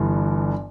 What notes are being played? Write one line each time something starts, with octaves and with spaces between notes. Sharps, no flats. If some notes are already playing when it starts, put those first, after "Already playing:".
Already playing: G1 G2 E3